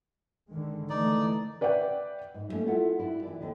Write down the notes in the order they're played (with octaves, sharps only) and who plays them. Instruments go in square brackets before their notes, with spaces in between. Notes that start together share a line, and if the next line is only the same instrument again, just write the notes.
[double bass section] D3 D#3 G#3
[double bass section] D#3 E3 A3 [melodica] D#4 D5
[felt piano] B4 D5 E5 F#5 G5
[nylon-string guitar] G#2
F#3 G3 A3 A#3 C#4
E4 F4 A4 E5 F#5
D4 E4 F#4 G4
E3 D5
D#2 D3 D#3